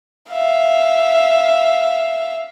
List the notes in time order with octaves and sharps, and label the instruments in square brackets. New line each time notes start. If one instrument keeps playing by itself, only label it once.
[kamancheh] E5 F5